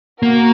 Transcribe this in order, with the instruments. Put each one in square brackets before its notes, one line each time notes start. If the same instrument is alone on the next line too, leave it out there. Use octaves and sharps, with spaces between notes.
[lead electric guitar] A#3 [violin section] F#4 A#4